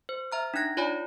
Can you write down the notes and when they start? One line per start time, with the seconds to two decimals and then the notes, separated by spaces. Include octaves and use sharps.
0.09 C5
0.32 E5 A#5 F6
0.54 D4 D#4 F#6 A#6
0.77 F4 C#5 D5 G#5 B5